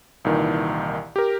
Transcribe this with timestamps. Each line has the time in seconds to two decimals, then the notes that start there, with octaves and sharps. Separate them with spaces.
0.25 C2 A#2 D#3 E3
1.16 G4 A#4